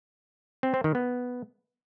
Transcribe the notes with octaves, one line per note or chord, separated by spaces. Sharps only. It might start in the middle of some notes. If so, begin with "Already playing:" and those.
C4
C4
D#3
B3